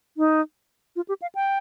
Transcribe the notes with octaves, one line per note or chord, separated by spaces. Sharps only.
D#4
F4
G4
F5
G5